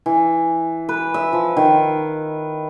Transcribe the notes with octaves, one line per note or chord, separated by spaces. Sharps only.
E3
B4
E5
F3
D#3